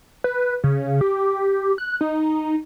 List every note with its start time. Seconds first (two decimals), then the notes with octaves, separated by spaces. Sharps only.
0.24 B4
0.64 C#3
1.01 G4
1.78 F#6
2.01 D#4